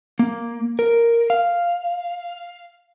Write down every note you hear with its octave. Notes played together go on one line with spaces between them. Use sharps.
A#3
A#4
F5